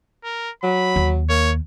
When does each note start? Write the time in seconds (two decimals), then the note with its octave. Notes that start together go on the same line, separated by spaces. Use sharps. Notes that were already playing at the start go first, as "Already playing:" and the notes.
0.24 A#4
0.63 F#3 B5
0.96 D#2
1.30 A#3 C#5